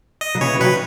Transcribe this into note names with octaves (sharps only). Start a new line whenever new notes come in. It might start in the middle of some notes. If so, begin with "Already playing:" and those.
D#5
F#3
C#3 E3 C#5
E3
D#3 F#3 B4